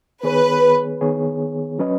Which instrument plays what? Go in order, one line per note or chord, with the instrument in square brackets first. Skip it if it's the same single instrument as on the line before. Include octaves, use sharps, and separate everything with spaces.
[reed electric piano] D#3 B3 G#4 C#5 [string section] B4
[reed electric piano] D#3 B3 G#4 C#5
F#3 C#4 B4 D#5